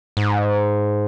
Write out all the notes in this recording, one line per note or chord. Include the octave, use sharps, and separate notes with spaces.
G#2